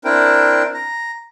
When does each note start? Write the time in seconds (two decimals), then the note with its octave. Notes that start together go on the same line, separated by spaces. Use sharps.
0.05 C4 D4 E4 A#4 G5
0.74 A#5